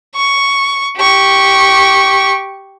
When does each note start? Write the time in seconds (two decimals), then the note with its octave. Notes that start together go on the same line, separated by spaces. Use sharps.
0.16 C#6
0.97 G4 C#6